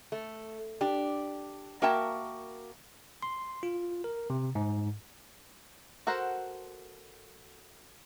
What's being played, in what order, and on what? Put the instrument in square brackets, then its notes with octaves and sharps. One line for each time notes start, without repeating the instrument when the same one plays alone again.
[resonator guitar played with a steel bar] A3
D4 G4
A#3 F#4 A#4 E5 G5 A5
[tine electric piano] C6
F4
A#4
C3
G#2
[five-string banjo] F#4 A4 A#4 C5 F#5